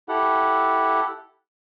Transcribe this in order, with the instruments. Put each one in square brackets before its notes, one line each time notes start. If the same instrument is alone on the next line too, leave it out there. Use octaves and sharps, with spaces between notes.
[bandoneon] E4 G4 A4 F#5